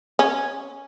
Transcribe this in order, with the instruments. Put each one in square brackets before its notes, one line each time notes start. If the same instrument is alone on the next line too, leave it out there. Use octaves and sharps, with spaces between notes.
[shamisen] C#4